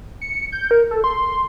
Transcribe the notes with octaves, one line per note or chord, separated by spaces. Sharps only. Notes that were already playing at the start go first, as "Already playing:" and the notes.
C#7
G6
A#4
A4
C6